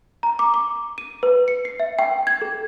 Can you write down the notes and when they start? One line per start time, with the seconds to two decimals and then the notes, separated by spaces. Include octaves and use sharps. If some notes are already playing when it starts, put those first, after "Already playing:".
0.23 A#5
0.39 D6
0.54 D6
0.98 D#7
1.23 B4
1.48 C#7
1.65 C7
1.80 E5
1.99 G5
2.27 G#6
2.42 A4